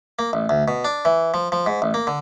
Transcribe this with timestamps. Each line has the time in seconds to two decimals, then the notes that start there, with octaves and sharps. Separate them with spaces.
0.19 A#3
0.33 A1
0.49 D2
0.68 B2
0.85 D4
1.05 E3
1.34 F3
1.52 F3
1.66 G#2
1.82 A1
1.94 A#3
2.07 D3